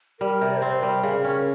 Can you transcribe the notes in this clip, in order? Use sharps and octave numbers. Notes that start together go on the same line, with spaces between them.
G3 A#4
C3
D5
C5
C4
G3 A#4
C#3
C#4